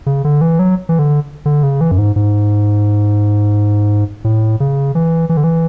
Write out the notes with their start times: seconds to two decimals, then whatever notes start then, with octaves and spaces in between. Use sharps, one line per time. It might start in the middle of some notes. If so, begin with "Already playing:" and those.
0.06 C#3
0.24 D3
0.41 E3
0.59 F#3
0.89 E3
0.99 D3
1.46 D3
1.63 C#3
1.81 E3
1.91 F#2
1.98 G#2
2.16 G#2
4.24 A2
4.60 C#3
4.95 E3
5.29 E3
5.37 D3
5.44 E3